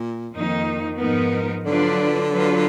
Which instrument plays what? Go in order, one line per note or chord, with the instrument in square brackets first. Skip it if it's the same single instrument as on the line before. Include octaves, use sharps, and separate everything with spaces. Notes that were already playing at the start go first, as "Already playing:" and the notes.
Already playing: [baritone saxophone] A#2
[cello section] F2 D#3 A#3 D#4
G#2 F3 B3 D#4 A#4
[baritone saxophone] D3 [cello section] F#3 D4 F4 B4 D5
[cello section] F#3 D4 F4 B4